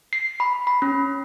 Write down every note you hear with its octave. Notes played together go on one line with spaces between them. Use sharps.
C7
B5
B5
C#4